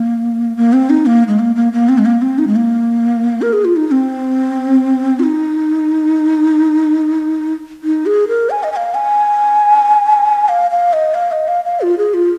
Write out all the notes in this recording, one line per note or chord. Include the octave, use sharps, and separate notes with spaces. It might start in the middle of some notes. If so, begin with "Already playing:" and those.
Already playing: A#3
A#3
C4
D#4
A#3
G#3
A#3
A#3
A#3
C4
G#3
A#3
C4
D#4
G#3
A#3
A#4
G#4
F4
D#4
D#4
C4
F4
D#4
D#4
G#4
A#4
G#5
D#5
G#5
F5
G#5
F5
F5
D#5
F5
D#5
F5
F5
F4
G#4
F4